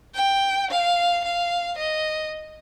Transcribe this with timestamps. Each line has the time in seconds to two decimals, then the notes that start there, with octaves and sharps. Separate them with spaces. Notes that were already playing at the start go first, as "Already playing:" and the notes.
0.15 G5
0.70 F5
1.24 F5
1.77 D#5